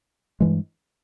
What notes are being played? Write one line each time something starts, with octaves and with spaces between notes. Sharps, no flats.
G2 E3 G#3